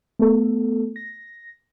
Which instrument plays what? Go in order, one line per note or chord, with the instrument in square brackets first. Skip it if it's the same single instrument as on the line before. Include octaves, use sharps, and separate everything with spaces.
[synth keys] A3 B3 A4
A#6